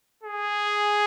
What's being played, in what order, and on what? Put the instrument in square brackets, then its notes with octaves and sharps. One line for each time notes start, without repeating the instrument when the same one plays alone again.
[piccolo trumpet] G#4